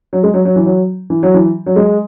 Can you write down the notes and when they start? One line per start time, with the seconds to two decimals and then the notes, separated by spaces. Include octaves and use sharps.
0.13 F#3
0.23 G#3
0.34 F#3
0.45 F#3
0.56 E3
0.66 F#3
1.10 E3
1.23 F#3
1.34 E3
1.66 F#3
1.76 G#3